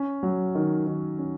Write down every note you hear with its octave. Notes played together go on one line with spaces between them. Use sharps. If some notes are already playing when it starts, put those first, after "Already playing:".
Already playing: C#4
F#3
D#3
D#3
C#4